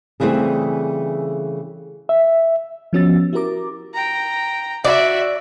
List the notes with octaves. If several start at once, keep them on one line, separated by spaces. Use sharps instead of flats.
C#3 E3 G3 A3 C4 G#4
E5
F3 B3 C#4 F#4 E6 A6
E4 F#4 G4 A#4 A#5 D6
G5 A#5
F#4 D5 E5